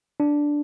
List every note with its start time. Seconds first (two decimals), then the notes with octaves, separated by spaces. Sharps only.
0.20 D4